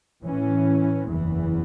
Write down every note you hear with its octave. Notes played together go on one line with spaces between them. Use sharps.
A2 E3 C#4
F#1 E2 E3